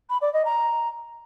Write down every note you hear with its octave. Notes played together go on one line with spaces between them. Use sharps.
B5
D5
D#5
A#5